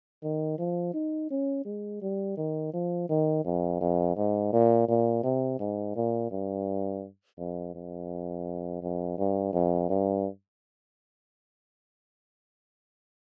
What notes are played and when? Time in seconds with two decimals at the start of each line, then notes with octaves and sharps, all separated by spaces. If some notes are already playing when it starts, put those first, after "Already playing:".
0.23 D#3
0.58 F3
0.94 D#4
1.31 C#4
1.65 G#3
2.02 G3
2.37 D#3
2.74 F3
3.09 D#3
3.45 F2
3.81 F2
4.17 G#2
4.53 A#2
4.88 A#2
5.24 C3
5.60 G#2
5.96 A#2
6.31 G2
7.38 F2
7.75 F2
8.82 F2
9.18 G2
9.53 F2
9.89 G2